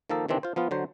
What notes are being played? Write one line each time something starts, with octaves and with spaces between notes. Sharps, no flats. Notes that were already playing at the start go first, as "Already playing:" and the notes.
D#3 F3 A#3 D#4 A4
C3 D#3 E3 C4 D4
F4 C5
F3 B3 F4
D3 F#3 C5